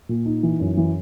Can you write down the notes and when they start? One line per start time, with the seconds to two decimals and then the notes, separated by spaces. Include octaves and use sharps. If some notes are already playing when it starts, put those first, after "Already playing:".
0.09 A#2
0.26 D#4
0.43 E3
0.60 F#2
0.77 E3